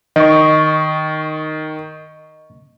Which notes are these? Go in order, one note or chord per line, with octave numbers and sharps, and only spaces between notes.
D#3 D#5 C#6